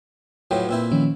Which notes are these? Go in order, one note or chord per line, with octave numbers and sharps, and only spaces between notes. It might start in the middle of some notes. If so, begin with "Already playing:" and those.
A2 F3 F#3 B4 G5
A#2 C4 E4
D#3 F3 C#4